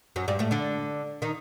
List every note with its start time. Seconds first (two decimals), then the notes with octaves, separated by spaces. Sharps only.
0.16 F#2 F#3
0.28 G2 G3
0.39 A2 A3
0.51 D3 D4
1.22 D#3 D#4